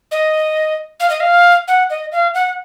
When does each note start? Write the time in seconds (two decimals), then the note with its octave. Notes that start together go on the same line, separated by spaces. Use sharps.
0.11 D#5
1.00 F5
1.10 D#5
1.20 F5
1.68 F#5
1.90 D#5
2.12 F5
2.34 F#5